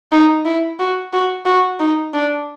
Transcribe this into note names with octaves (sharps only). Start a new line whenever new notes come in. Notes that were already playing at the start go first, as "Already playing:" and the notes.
D#4
E4
F#4
F#4
F#4
D#4
D4